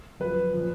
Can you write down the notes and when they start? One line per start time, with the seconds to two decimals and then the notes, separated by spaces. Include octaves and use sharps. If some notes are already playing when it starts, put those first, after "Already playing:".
0.20 F#2 F3 B4
0.53 A#2 F3